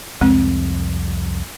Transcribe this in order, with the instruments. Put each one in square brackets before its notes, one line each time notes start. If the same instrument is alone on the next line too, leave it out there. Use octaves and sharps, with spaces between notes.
[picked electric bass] C2 F2 [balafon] G#3 C4